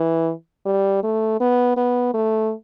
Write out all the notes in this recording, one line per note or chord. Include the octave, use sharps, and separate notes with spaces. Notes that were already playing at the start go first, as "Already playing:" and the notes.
Already playing: E3
G3
A3
B3
B3
A3